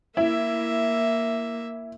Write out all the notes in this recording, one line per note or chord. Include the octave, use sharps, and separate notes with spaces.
A#3 E4 E5